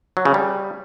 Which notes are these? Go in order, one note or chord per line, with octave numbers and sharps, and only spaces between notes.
F#3
C#3
G3